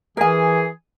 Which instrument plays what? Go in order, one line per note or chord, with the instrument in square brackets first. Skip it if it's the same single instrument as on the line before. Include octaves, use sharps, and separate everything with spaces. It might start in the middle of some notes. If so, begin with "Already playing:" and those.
[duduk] E3 [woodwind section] G#4 [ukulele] A#4 G#5